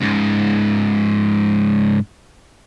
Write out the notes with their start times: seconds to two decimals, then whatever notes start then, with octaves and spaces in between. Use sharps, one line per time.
0.01 C#2 G#2